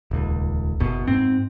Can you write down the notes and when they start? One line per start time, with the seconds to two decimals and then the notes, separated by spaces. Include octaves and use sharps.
0.11 D#1 C#2
0.80 F#1 B2
1.07 G#2 C4